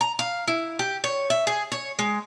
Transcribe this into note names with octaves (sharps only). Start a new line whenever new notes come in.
A#5
F5
E4
G4
C#5
E5
G#4
C#5
G#3